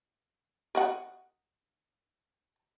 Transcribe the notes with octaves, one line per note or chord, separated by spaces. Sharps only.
A#4 D#5 F#5